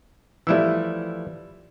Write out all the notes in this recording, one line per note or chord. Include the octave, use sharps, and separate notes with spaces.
E3 F3 G3 A3 E4 E6